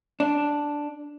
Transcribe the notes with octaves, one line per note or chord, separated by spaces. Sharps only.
D4